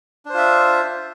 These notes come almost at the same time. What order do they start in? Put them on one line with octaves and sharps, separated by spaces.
D4 C5 F4 E5